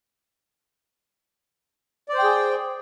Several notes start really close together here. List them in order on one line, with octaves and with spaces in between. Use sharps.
D5 C5 G5 G#4